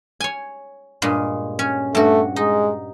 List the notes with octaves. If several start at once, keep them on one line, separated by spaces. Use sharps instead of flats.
C#5 G#5
G2 A#2 G#3
C#4
G2 A3 F#4
G#3 D#4